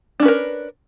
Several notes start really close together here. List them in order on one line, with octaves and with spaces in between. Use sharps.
D4 C#4 B4 A#4